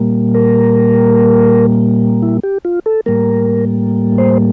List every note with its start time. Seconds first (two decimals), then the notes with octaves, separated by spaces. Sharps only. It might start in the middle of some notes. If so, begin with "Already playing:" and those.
Already playing: A#2 G3 A#3
0.35 A#4
2.22 E4
2.43 G4
2.65 F4
2.86 A4
3.06 A2 G3 A#3 A#4
4.18 C5